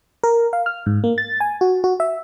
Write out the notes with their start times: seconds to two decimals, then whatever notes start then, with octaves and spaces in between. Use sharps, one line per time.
0.24 A#4
0.53 F5
0.66 F6
0.86 G#2
1.04 A#3
1.18 A6
1.40 G#5
1.61 F#4
1.84 F#4
2.00 E5